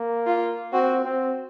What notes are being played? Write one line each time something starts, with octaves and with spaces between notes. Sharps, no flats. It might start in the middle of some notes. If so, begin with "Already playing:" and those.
Already playing: A#3
F4
C4 F#4
C4